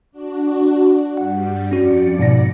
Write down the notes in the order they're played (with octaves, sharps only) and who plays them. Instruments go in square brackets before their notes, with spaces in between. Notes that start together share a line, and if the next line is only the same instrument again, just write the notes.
[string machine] D4 F#4
[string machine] G2 G3 [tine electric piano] F#5
[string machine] F2 D5 C#7 [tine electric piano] C#4 F#4
[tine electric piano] G#2 B2 A#6